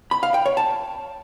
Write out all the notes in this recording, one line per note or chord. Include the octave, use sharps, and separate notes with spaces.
B5
F5
G5
C#5
A5